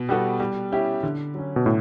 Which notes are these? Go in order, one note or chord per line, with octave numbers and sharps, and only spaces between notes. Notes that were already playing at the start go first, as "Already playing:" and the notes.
Already playing: B2
G3 B3 F#4 A4
G3
C#4 E4 G4
D3
F#3 C#4
B2
A2